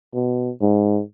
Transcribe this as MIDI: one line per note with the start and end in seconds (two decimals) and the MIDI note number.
0.14 0.51 47
0.61 1.01 44